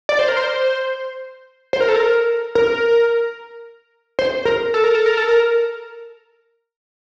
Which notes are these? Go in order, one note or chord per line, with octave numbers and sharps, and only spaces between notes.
D5
C5
A#4
C5
C5
A#4
A4
A#4
A#4
C5
A#4
A4
A#4
A4
A#4
A4
A#4